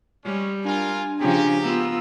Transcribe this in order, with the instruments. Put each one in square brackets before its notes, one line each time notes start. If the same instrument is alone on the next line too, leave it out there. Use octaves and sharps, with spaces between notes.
[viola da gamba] G3 [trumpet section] G#3 C#4
[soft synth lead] D4 [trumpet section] F4 A#4 [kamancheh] G#5
[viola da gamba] C#3 F3 C#4 [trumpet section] G4 [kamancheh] G#5 A#5
[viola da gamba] B3 F4 [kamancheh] A#5 E6